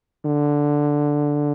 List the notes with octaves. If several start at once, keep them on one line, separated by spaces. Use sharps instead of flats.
D3